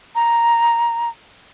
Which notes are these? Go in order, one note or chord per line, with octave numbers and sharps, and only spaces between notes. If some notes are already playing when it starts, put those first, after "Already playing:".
A#5